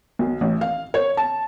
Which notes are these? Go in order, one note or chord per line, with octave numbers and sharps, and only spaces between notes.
B1
A1
F5
C#5
A5